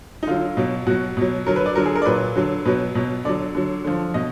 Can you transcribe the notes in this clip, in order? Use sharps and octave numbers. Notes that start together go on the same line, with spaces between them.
D#4
D3 F#3 F4
B2 F#3
B2 F#3 F#4
B2 F#3
D3 F#3 A#4
B4
D5
D3 F#3 A#4
G#4
A#4
D5
A#2 F#3 B4
D3 F#3
B2 F#3 B4
B2 F#3
D3 F#3 D5
D3 F#3
D3 F3
B2 D#5